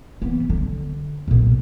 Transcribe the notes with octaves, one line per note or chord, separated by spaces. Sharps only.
E3 B3
D3
B1 A#2